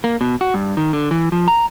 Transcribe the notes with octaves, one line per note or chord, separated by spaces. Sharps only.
A#3
B2
F#4
G2
D#3
D3
E3
F3
A#5